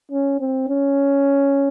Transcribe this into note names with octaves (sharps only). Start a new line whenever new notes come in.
C#4
C4
C#4